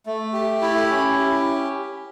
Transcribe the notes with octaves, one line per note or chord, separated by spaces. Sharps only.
A3
G4
E4
C#4
G4